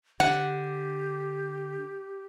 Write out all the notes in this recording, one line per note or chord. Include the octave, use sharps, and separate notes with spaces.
D3 G4 F#5